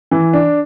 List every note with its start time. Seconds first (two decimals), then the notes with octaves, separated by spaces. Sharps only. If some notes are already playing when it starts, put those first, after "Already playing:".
0.11 E3
0.33 D4